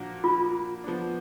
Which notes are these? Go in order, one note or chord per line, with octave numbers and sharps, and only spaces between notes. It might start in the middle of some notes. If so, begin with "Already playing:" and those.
Already playing: A#2 F3 A#3 D4 F#4
F4
F3 B3 D4